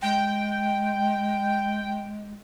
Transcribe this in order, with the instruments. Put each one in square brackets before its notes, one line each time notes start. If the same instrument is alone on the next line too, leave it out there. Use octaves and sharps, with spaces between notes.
[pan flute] G#3 [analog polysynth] G5